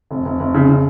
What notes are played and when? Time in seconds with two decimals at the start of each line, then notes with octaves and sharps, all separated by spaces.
0.11 F1
0.25 F1
0.40 F1
0.54 C#3
0.69 C#3